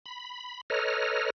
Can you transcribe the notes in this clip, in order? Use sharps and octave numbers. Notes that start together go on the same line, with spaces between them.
B5
A4 B4 C#5 D#5 A#5 F6